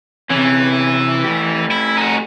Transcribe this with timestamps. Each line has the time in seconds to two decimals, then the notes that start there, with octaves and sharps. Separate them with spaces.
0.30 C3 E3 C#4
1.24 A3 G4
1.71 E4
1.97 D#4 F#4